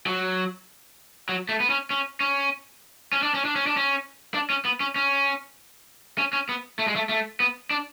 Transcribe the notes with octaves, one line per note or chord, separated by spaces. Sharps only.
F#3
F#3
A3
B3
C#4
C#4
C#4
C#4
D4
C#4
D4
C#4
D4
C#4
D4
C#4
B3
C#4
C#4
C#4
C#4
B3
A3
G#3
A3
A3
B3
D4